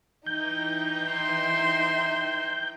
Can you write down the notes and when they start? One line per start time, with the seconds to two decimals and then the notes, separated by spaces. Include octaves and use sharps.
0.26 E3 D#4 G5 G6
1.11 E5 C6